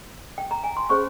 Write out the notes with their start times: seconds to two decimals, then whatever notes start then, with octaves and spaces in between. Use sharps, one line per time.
0.38 G5
0.51 A#5
0.64 G#5
0.77 C6
0.89 C#4 G#4 C5 C#6